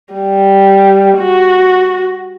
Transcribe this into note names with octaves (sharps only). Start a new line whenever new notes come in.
G3
F#4